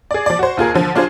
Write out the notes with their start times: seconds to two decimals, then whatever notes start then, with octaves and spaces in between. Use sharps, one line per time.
0.11 G#4 D5
0.26 F3 D5
0.39 F#4 C5
0.57 D#2 F4 G#4 A#4
0.74 D3 F3
0.95 F#3 D4 F4 G#4 C5